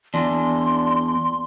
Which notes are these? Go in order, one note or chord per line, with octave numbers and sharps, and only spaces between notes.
E2 D4 C6